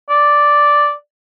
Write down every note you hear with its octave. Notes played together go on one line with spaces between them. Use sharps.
D5